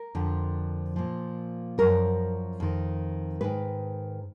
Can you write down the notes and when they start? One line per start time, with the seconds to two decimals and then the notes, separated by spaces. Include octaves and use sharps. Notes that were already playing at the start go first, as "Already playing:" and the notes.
Already playing: A#4
0.15 F2 D3 F3
0.96 A#2 F3
1.78 F#2 F3 A#4
2.60 F2 D#3
3.41 G#2 D#3 B4